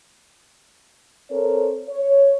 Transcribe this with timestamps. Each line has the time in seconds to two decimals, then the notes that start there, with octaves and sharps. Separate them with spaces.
1.31 C4 A4 A#4 C5 C#5
1.88 C#5